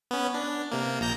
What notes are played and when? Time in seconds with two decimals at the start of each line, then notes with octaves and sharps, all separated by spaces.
0.11 B3 C#4
0.34 D4
0.72 C3 A#3
1.01 A#1 A#5 G6